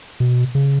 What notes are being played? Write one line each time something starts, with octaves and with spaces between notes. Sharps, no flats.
B2
C#3